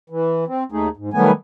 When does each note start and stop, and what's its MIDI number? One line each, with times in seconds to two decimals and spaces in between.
0.10 0.44 52
0.47 0.64 60
0.72 0.89 39
0.72 0.89 57
0.72 0.89 63
0.72 0.89 68
0.97 1.10 44
1.14 1.31 51
1.14 1.31 54
1.14 1.31 55
1.14 1.31 57
1.14 1.31 59
1.14 1.31 80